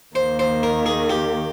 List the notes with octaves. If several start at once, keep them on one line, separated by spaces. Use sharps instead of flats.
D#2 D#3 A#3 C5
C5
A#4
G#4
G4